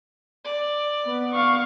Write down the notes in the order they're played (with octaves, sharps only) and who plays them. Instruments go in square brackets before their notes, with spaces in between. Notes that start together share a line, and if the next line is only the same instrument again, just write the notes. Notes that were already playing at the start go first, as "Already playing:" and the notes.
[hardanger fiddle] D5
[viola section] B3
[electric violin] F5 C#6